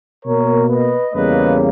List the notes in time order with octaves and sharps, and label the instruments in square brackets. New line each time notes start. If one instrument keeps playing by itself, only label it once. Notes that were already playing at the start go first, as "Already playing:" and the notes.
[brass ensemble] B2 A#3 A#4 C#5
B4 D#5
E2 C#3 G3 A#3 B4 D#5